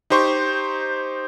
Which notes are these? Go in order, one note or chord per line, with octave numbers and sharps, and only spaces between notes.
D#4 G4 C5 C6 C#6